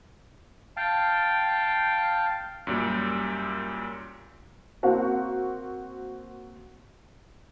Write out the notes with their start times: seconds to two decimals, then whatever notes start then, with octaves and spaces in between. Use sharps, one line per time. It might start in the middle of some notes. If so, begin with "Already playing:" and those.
0.77 F5 G5 A5
2.67 F#2 A#2 G3
4.83 A#3 C4 F#4 F5